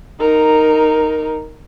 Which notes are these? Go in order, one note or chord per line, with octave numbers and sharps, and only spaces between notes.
D#4 A#4